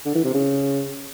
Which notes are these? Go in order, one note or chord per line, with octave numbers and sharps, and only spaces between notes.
D3
E3
C3
C#3